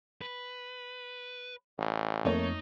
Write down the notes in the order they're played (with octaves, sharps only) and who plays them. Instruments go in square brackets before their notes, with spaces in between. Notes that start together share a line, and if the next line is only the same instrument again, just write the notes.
[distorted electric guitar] B4
[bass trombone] A1
[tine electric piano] F2 [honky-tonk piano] A3 A#3 C#5 [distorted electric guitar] D#4